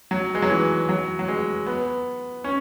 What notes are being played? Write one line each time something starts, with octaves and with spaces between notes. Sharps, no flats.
F#3
G#3
F#3
E3
F#3
F#3
G#3
B3
C#4